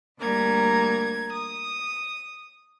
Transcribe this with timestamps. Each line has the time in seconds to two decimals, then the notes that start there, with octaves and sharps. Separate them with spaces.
0.19 D2 G3 A#3 A#5 G#6
1.32 D#6